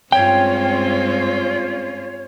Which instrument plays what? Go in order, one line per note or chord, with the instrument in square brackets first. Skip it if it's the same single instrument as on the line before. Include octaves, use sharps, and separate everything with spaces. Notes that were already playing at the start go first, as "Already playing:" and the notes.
[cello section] G2 C#4 F4 [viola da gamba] G#3 C4 [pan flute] C#5 [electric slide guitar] G5